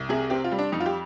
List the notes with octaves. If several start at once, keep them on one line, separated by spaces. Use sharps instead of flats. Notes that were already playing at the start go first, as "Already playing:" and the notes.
Already playing: C2
C3 G#4
C4 G4
F4
G3
D4
F2 D#4
F4
G4